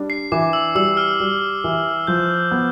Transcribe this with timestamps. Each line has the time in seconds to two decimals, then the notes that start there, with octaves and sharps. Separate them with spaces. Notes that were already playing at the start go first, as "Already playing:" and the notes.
Already playing: G3 D4
0.10 C7
0.32 E3 D6
0.53 E6
0.75 G3 E6
0.97 F6
1.20 G3
1.64 E3
2.07 F3 G6
2.51 B3